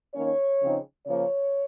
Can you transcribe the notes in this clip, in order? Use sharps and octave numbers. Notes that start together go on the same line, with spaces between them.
D#3 A#3 C#4 C#5
C#3 F3 C4 D#4
C#3 F3 A#3 C#5